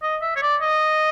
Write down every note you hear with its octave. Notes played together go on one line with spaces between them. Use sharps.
D#5
E5
C#5
D5
D#5